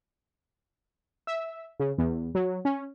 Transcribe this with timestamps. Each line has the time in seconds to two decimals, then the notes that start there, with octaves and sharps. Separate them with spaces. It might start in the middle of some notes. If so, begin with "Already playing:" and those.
1.27 E5
1.80 C#3
1.98 E2
2.35 F#3
2.65 C#4